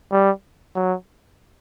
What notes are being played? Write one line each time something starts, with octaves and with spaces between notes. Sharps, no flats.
G3
F#3